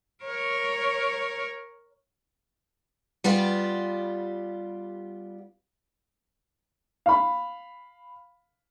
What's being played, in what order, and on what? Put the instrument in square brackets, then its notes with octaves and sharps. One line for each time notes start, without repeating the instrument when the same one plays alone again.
[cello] A#4 C#5
[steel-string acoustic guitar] G3 B3 F4 G4
[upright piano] F5 B5